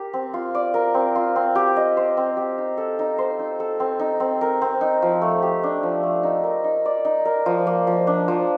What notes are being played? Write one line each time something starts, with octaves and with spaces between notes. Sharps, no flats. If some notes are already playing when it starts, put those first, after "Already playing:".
Already playing: G4 A#4
C4
F4
D5
A#4
C4
F4
C4
G4
D#5
C5
C4
G4
D#4
A4
D#4
C5
D#4
A4
C4
D#4
C4
A#4
C4
D#4
F3
A3
G4
D4
F3
A3
D#4
A#4
D#4
D5
D#4
A#4
F3
A#3
F3
D4
F3